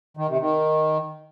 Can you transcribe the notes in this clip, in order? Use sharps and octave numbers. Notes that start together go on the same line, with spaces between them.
D#3
C3
D#3